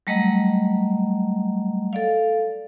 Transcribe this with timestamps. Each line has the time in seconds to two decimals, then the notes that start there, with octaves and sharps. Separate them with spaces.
0.07 F#3 G3 A3 D#5 F#5 A#5
1.93 A4 D5 F5